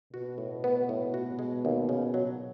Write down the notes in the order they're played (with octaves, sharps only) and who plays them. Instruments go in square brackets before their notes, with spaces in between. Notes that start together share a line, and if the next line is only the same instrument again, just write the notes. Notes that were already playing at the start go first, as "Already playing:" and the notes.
[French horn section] B2 [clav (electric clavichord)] F#4
[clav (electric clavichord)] A2
B3
A2
F#4
G#3
D#2
C#3
F#3